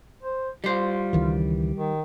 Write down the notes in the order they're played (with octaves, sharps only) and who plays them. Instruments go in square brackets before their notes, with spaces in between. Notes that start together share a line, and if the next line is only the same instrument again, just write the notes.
[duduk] C5
[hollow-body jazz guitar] G3 C5 [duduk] F4
[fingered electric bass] C#2 D#3 E3
[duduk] D#3